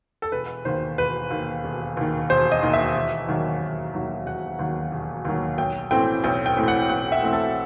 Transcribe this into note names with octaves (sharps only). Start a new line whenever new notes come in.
A4
E1 B4
D#2 D#3 C5
E1 B4
D#2 D#3
E1
D#2 D#3
E1 C5
D#5
D#2 D#3
E5
E1
D#2 D#3 F#3
E1
D#2 D#3 F#3
E1 F#5
D#2 D#3 F#3
E1
D#2 D#3 F#3
B1 G5
A2 E3 A3 C4 G5
B1 G5
G5
A2 E3 A3 C4
F#5
B1 F#5
E5
A2 E3 A3 C4
A4